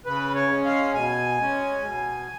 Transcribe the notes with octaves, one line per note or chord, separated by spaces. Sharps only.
C#3 B4
C#5
G#3 C#4
F5
B2 G#5
G#3 C#4
B2